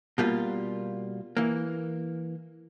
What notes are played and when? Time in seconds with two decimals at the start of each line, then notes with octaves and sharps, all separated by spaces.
0.18 B2 G3 A#3 F4
1.37 E3 A#3